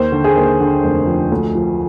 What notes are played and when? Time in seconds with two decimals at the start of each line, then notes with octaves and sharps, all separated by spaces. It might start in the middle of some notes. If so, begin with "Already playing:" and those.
Already playing: D#2 C5
0.12 D3
0.24 G#4
0.36 D#2
0.60 D3
0.84 F1
1.07 F3
1.32 D2
1.55 F3